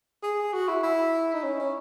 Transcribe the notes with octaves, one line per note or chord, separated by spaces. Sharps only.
G#4
F#4
E4
E4
D#4
C#4
C#4